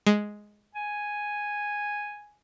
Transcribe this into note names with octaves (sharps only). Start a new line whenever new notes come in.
G#3
G#5